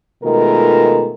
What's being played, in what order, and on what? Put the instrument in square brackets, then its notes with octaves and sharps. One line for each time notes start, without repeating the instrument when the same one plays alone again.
[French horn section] B2 D#3 G#3 A3 F4 A#4